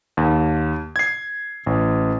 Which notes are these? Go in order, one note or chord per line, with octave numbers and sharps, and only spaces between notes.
D#2
G#6 C7
A1